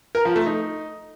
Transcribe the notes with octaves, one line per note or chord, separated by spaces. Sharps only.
A#4
F3
A3
D#4